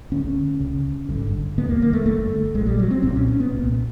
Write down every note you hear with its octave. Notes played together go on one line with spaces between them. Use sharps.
D2 D3 C#4
C#2 C#3
G#1 G2 D3
E1 D#2 D3 B3
A#3
A#3
A3
G1 G2 D3 A3
A#1 A#2 G#3
G3
F#3
C4
C2 A#2 C4
C#4
C#4
B3
C2 A#2